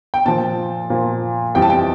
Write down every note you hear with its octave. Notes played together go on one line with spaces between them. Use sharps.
G5
A#2 F3 A5
A#2 F3
F2 E3 G3 G5
A5
G5